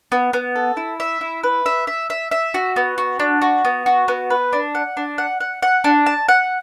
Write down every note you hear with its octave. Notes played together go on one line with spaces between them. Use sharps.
B3
B3
A4
E4
E5
E4
B4
E5
E5
E5
E5
F#4
B3
F#4
D4
F#4
B3
F#4
B3
B4
D4
F#5
D4
F#5
F#5
F#5
D4
A5
F#5